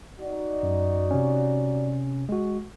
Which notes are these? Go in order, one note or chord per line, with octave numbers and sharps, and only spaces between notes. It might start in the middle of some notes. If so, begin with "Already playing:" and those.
D#4 F#4 D5
F#2
C3 C#4
G#3 F#4